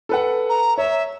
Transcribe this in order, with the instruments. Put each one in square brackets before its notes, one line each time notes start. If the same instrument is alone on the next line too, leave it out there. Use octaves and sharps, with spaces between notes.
[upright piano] A4 B4 F#5
[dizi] A#5
[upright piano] C#5 [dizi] E5